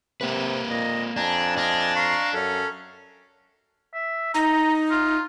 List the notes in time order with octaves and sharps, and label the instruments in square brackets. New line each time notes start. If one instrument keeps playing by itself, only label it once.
[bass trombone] C3 [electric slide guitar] A#3 B4
[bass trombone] A#2 [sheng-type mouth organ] D#5
[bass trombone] F2 [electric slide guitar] D4 [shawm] G#5 [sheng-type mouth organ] A#5
[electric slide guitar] D4 [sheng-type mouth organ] D#5 D6 F6
[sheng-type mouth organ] F5 A#5 C#6 [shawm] C6
[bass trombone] F#2 [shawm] C#4 [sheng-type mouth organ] A4
[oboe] E5
[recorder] D#4 [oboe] A#5
[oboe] F4